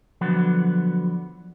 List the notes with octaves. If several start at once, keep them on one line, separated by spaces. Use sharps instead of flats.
D3 F3 F#3 B3